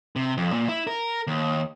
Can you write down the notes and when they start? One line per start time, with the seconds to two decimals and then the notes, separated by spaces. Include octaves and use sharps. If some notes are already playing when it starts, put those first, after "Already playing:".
0.16 C3
0.37 F2
0.53 A#2
0.69 E4
0.87 A#4
1.27 D#2